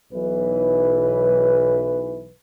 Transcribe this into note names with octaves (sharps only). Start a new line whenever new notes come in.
B1 E3 B4